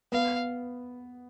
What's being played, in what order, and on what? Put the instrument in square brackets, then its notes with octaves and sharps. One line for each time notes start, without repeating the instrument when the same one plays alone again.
[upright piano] B3 [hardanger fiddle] F5